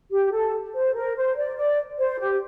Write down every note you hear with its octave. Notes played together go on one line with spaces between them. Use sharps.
G4
A4
C5
A#4
C5
D5
D5
C5
G4